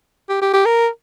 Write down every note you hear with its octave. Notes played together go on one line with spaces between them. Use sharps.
G4
G4
G4
A#4